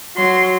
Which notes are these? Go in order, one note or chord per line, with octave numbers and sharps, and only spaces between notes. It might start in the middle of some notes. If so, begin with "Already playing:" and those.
F#3 C6